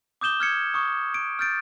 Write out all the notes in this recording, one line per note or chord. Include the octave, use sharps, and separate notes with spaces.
D6 D#6 G6 E7 G7
F6 G#6 C#7
C#6 D#6
D7
F6 G6 A6 D7